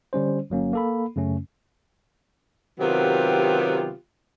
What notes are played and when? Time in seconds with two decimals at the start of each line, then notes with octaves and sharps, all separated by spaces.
0.13 D3 G3 C#4 C5
0.50 G1 F#3 A#3 C#4
0.73 A#3 A4 B5
1.16 F#2 C#3 A3 C#4
2.80 C3 D#3 F#3 B3 F4 G4